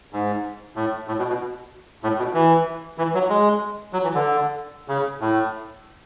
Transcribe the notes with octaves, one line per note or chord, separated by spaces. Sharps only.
G#2
A2
A2
B2
B2
A2
B2
E3
E3
F#3
G#3
F#3
E3
D3
C#3
A2